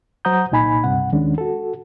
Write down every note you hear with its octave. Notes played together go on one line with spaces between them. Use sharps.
F#3 C5 F#5 A#5 D#6 G6
C2 A#2 D#4 G#5 B5
C#2 G2 C3 F#5
D#2 D#3 G#3 C#4 D4
F#4 A4